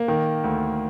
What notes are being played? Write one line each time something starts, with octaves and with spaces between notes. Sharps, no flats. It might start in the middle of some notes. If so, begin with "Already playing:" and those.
Already playing: A#3
D#3
D2